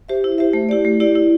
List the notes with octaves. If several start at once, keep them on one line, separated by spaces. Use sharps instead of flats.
G4 C5 E5
E4
G4 C5 E5
A3
E4 G4 D5
A3
E4 G4 D5
E4